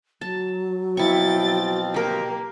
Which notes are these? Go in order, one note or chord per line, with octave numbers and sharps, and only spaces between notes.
F#3 A5
B2 F3 C4 E4 G5 C#6 A6
A#3 G4 A#4